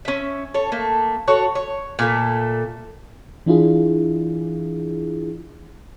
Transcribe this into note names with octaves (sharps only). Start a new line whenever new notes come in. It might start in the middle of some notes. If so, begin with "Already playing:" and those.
C#4 E5
A4 C#5
A3 A#3
F#4 A4 C#5
C#5
A#2 A3 E5
E3 D4 E4 F4 G#4